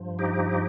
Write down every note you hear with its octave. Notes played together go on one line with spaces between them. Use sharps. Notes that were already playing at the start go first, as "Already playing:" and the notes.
Already playing: G2 F3
D#4 G4